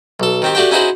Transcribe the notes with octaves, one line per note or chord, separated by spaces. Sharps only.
B1 A4
D#3 C4 G4
A3 D4 F#4 G4 G5
C#4 D#4 E4 F#4 G#4 C5